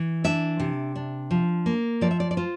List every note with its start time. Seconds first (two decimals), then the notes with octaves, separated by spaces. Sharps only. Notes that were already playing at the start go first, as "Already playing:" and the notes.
Already playing: E3
0.24 D4 E5
0.60 C3
0.95 D4
1.31 F3
1.66 A#3
2.01 F3 D5
2.11 E5
2.20 D5
2.31 D5
2.37 F4 C5